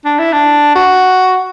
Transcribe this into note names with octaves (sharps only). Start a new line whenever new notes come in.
D4
E4
D4
F#4